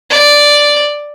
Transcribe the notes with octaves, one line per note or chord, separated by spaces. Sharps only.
D5